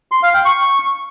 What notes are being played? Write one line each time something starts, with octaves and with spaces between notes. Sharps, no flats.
C6
F5
G5
C#6